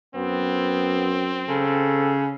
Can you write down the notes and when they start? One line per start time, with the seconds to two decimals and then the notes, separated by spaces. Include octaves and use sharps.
0.15 F#2 B3 C4
1.49 C#3 A4